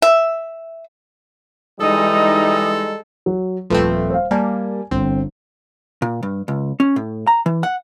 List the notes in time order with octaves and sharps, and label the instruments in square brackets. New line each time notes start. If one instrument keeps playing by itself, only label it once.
[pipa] E5
[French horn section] E3 G3 G#3 [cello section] D#4 [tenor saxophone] A4 [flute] D#6
[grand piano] F#3
[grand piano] D#1 A4 B4 [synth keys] F3 A3 C4
[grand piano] C5 F5
[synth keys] G3 A#3 [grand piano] D5 G#5 A5
[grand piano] G1 [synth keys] C4
[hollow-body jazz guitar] A#2
G2
C#2
C#4
A2
A#5
E3
F#5